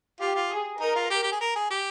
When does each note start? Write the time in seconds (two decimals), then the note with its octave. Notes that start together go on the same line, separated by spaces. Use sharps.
0.20 F4 G4
0.36 F4
0.51 G#4
0.80 D#4 A#4
0.95 F4
1.10 G4
1.23 G4
1.32 G#4
1.41 A#4
1.55 G#4
1.70 G4